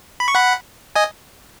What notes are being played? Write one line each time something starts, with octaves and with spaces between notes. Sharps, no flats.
B5
C#6
F#5 B5
D#5 G#5